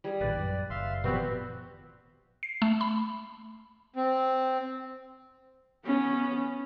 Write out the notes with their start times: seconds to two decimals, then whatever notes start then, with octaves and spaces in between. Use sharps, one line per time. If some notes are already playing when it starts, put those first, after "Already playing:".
0.04 G3 G#4
0.21 A1 A#2 D#3 B4 D5
0.36 F#2
0.70 F#1 E5 F5 C6
1.04 A#2 D#3 F3 B3 C4 F#4 G4 D5
2.43 C7
2.62 A3
2.81 B5
3.96 C4
5.86 B3 C#4